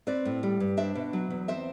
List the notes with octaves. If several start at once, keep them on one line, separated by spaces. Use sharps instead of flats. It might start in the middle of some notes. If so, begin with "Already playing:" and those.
C4 B4 D5
A2
G3
G2
D4 C5 E5
B2
F#3
E2
C4 C5 E5